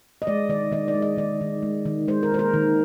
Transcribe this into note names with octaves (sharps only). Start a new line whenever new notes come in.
D#5
G#3 D5
D#3 D5
D#3 D#5
D5
G#3
D#5
D#3 D5
D#3
G#3
D#3
G#3 C5
A#4
G#3 C5
A#4
D#3